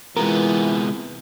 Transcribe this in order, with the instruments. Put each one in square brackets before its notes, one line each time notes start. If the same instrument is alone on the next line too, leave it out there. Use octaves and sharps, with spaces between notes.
[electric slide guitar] C3 B3 [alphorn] E3 [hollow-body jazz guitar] G#3 F4 A#4